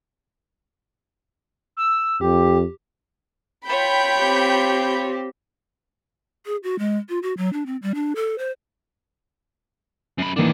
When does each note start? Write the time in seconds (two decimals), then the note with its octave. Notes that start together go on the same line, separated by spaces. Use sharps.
1.77 E6
2.21 F2 G4
3.68 F4 C#5 G5 B5 G6
4.20 C4 G4
6.46 G#4
6.63 F#4
6.79 G#3
7.09 F4
7.23 F#4
7.37 F#3
7.53 D4
7.66 C4
7.82 G3
7.95 D4
8.16 A4
8.38 C5
10.19 F#2 B5
10.36 D#3 E3 A#3 D4